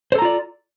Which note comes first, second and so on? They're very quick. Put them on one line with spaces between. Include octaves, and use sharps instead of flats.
C5 A4 A#5 F4 D5